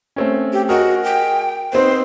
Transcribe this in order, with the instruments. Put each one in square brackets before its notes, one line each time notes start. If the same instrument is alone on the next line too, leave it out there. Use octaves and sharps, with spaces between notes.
[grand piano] A3 C4 C#4
[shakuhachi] G4
[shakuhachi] F#4 [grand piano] G#4 A#4 D#5
[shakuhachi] G5
[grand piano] B3 C4 D#4 [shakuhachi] C5